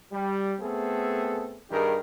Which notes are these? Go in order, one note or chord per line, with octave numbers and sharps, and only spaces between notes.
G3
A3 B3 C4 G#4 A4
G2 D#3 G4 G#4 A#4